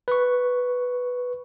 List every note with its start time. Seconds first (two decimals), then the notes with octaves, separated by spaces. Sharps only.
0.08 B4 C#6